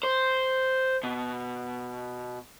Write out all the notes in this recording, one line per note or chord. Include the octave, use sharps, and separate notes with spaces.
C5
B2